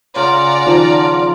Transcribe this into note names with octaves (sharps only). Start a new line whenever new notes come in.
C#3 F4 D5 F#5 A#5
D#3 F3 A5